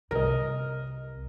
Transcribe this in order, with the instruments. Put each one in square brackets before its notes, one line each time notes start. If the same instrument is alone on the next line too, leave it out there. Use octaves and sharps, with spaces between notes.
[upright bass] C2 C3 [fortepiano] A#4 D#5